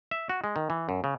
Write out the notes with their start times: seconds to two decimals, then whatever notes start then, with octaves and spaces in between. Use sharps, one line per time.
0.11 E5
0.29 F#4
0.44 G#3
0.56 D#3
0.70 E3
0.89 F#2
1.04 C#3